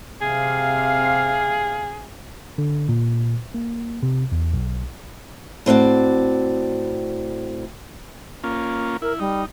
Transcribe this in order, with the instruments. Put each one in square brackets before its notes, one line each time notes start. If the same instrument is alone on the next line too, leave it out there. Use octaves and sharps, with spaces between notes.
[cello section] C3 F5 [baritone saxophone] G#4
[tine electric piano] D3
A#2
A#3
C3
E2
B1
[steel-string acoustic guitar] A2 C4 F#4 D5
[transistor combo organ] A#3 C#4 F4
[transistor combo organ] E4 [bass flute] A#4
[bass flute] G3 [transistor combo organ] D#4